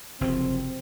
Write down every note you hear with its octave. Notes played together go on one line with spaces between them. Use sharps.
F#1 A2 C3 F3 C4